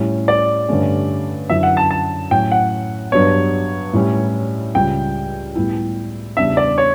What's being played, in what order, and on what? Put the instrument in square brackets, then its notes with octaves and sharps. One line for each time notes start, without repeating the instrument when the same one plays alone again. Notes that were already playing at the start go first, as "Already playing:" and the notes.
Already playing: [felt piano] A2 G3 C#4
[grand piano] D5
[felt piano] G2 D3 A3 C#4
[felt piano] F#2 D3 F#3 C#4 E4 [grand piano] E5
[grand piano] F#5
A5
A5
[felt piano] A2 F#3 C#4 [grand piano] G5
[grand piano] F#5
[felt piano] G2 F#3 B3 D4 [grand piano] C#5
[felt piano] A2 G3 C#4 E4
[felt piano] C#2 C#3 G3 [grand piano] G5
[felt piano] A2 G3 B3 E4
[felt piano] E2 C#3 G3 D4 [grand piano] E5
[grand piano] D5
C#5